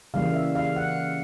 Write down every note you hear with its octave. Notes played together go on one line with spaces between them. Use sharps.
C#3 E3 G3 A#3 F5
E5
F5
F#5